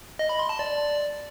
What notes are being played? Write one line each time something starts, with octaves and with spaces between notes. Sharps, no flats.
D#5
B5
C6
A5
D5